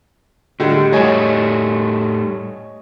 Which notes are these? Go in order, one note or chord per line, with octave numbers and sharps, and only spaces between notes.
A2 D3 G3 G#3
A2 G3 A3 C#5 D#5 G#5